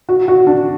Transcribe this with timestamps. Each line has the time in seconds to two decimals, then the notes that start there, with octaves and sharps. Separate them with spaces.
0.09 F#4
0.28 F#4
0.47 D4